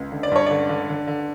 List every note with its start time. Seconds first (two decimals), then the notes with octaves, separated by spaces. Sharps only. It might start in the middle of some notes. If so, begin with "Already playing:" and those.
Already playing: C#2
0.12 D3
0.23 D5
0.31 G2 C#5
0.46 D3 D5
0.69 D3
0.89 D3
1.07 D3